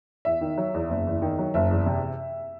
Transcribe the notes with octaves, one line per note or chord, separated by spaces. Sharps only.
E2 E5
D#3
F#3
E2
F#1
E2
D#3
F#3
F#1 E5
E2
C3